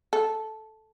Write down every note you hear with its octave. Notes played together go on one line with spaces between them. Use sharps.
A4